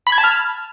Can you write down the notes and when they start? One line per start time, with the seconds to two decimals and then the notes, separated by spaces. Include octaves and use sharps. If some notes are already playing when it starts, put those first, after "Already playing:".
0.07 B5
0.12 G#6
0.18 A5
0.24 F6